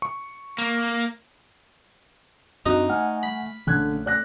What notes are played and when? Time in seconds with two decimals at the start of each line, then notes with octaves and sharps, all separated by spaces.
0.02 C#6
0.58 A#3
2.66 F#2 C4 D4 D#4 F#4
2.89 A3 F#5 G#5 F6
3.23 B5
3.67 A#1 D3 A3 C#4 F#6 G#6
4.06 D5 F#6 A#6